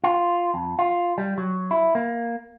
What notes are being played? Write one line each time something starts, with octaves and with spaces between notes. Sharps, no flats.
F4
F2
F4
G3
F#3
E4
A#3